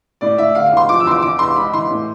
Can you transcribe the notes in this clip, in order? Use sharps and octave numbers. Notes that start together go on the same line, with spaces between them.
A2 D5
A2 E5
D3 F5
F5
E2 C6
F3 D6
E6
E2 C6
D6
E2 D6
E2 C6
G#2 B5
E3 C6
A2